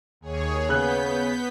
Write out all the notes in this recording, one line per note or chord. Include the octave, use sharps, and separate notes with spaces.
D#2 G#4 C#5
C#3 B3 F#6 G6 B6